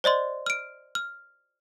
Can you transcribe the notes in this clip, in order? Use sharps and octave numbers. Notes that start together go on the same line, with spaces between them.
C5 D5 D#5 C6
F6 D7
F6